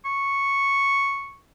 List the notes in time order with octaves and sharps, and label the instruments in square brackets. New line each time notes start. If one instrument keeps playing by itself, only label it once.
[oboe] C#6